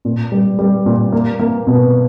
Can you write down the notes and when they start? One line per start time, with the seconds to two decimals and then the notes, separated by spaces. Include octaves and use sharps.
0.05 A#2
0.32 G3
0.59 G3
0.86 A#2
1.12 A#3
1.39 A#3
1.67 B2